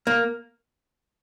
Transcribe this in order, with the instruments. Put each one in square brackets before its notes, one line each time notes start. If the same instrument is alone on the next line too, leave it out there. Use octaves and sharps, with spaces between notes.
[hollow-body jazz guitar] A#3